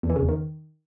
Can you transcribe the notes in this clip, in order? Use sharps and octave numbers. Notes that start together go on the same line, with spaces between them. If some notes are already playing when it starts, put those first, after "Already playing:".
E2
E3
C#3
E2
D#3